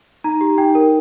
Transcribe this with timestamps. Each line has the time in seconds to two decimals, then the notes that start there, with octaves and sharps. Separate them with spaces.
0.24 D#4 A#5
0.41 G4
0.58 D#4 G5
0.75 A#4